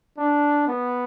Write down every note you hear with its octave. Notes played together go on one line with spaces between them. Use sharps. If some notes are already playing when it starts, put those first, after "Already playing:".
D4
B3